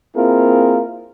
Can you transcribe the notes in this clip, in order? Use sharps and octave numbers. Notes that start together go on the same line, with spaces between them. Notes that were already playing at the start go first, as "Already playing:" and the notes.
A#3 C4 E4 F4 G#4 A#4